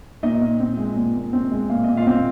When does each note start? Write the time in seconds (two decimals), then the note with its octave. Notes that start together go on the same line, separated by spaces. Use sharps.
0.23 A#2 D#4 D#5
0.41 A#2
0.60 C4
0.77 G#3
0.96 A#2
1.15 A#2
1.33 C4
1.51 G#3
1.70 A#2 F5
1.84 A#2 D#5
1.97 F4 F5
2.07 C4